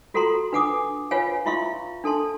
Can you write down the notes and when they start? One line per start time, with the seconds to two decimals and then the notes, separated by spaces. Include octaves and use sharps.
0.14 F4 F#4 A4 F#5 A#5 C6
0.52 D4 B4 F#5 G#5 D6 D#6
1.11 F4 B4 C#5 F5 F#5 G#5
1.46 E4 F4 E5 F5 C6 C#6
2.04 D4 A4 A5 C6